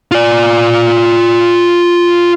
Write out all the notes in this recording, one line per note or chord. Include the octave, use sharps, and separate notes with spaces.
F4 D5